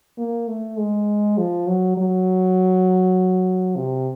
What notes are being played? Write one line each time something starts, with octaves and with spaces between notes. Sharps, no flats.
A#3
A3
G#3
F3
F#3
F#3
C3